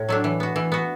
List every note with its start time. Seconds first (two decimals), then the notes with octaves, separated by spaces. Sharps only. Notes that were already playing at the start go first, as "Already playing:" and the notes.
Already playing: A2
0.09 F#3 A3 D4
0.24 E3
0.40 B3 F#4
0.56 E3
0.72 B3 F#4